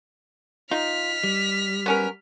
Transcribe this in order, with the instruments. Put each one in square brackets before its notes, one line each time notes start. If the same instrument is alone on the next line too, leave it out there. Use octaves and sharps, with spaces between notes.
[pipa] D#4 [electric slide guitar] F4 [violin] F6 B6
[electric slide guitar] G3
[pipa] B3 C#4 A#4